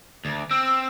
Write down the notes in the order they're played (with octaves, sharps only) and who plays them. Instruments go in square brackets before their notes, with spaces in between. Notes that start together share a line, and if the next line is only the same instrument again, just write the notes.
[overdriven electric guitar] D2
[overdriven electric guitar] C4 [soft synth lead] E6